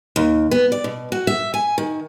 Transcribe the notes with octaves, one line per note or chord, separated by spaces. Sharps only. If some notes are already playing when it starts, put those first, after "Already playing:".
D#2
B3
D5
B2
F#4
E5
G#5
D#3